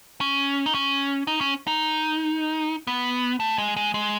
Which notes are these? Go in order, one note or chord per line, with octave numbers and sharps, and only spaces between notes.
C#4
D#4
C#4
D#4
C#4
D#4
B3
A3
G#3
G#3
G#3